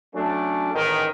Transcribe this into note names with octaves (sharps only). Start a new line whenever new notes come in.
F#3 A3 C#4 D4
A1 G#2 D#3